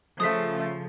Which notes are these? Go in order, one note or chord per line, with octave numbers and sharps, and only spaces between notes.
C#3 F3 A3 D#6 B6